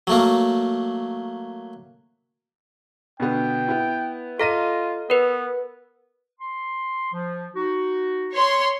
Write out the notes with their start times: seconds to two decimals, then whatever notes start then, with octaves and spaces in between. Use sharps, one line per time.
0.07 F#3 A3 A#3
3.20 B2 D3 B3 G5
3.68 B3 E4
4.39 F4 A4 D#5 A#5 A#6 D#7
5.10 B3 A#4 B4
6.40 C6
7.13 F3
7.55 D#4 F#4
8.34 C#5 C6